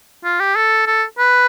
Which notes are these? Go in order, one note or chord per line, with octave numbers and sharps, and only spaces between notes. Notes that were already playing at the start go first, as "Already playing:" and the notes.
F4
G4
A4
A4
B4